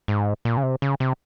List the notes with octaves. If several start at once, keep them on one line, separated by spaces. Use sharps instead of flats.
G#2
A#2
C#3
C3
C#3
C3